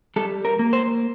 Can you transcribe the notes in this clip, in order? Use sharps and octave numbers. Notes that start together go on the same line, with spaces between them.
G3 A4
A#4
A#3
C5